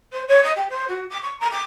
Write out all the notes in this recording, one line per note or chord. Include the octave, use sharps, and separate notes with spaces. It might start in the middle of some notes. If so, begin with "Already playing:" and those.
C5
C#5
D#5
G4
C5
F#4
D6
C#6
A#5
D6